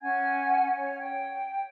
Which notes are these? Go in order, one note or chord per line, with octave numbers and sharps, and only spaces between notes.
C#4 F#5 G#5 G#6
C#5
G5